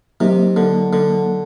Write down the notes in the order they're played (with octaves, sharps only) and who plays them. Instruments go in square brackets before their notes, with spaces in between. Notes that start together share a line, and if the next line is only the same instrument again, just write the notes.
[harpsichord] C3 [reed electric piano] F#3 A#3 D#4
[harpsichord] D3
D3